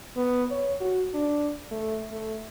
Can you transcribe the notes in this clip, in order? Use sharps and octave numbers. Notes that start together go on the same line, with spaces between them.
B3
C#5
F#4
D4
A3
A3